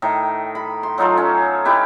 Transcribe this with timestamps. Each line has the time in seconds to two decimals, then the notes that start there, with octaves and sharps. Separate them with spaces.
0.02 A2 D#3
0.55 B5
0.83 C6
0.98 F#3 D#4 F4 A4
1.18 C#4
1.65 D#4 E4 G4 B4